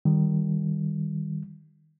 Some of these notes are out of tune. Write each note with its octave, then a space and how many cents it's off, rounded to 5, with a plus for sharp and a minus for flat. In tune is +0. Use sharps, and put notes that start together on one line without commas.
D#3 +0 G3 +0